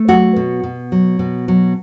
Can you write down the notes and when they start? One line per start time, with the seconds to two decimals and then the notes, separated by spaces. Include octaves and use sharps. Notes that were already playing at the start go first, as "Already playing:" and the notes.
Already playing: A3
0.08 F#3 F#4
0.36 B2
0.63 B2
0.92 F#3
1.19 B2
1.48 F#3